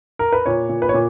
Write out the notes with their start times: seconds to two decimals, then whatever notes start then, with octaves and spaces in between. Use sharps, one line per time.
0.19 A#4
0.32 B4
0.46 A#2 C#5
0.69 A#2
0.82 B4
0.89 C#5
0.94 A#2